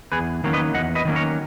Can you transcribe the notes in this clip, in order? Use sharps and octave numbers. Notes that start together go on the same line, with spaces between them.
E2 G#4 B4
D#3 F#3 A#3 C#4
B4 D#5
E2 D#5 F#5
B4 D#5
D#3 F#3 A#3 C#4
A#4 C#5